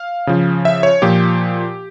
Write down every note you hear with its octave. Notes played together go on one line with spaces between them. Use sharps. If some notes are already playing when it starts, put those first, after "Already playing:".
Already playing: F5
C#3 F3
E5
C#5
A#2 F3 G4